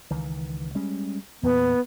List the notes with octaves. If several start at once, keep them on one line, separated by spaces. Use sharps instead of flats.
C#2 D#3 E3
G3 G#3 C#4
E2 A#2 B3